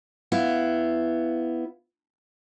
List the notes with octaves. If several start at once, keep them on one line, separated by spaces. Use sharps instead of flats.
B3 E4 F5